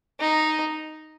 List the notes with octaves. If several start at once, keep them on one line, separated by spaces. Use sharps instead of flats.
D#4